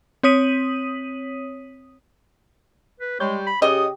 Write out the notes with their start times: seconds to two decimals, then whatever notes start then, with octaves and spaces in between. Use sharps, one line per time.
0.23 C4 C#5 D#6 B6 D#7 F#7
3.00 B4
3.20 G3 G#3 C#5 G6
3.47 B5
3.62 C#3 G4 D#5 D#6